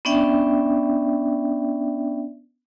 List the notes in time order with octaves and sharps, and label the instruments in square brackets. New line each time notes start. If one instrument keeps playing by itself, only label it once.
[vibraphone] B3 C#4 D4 D5 E5 G5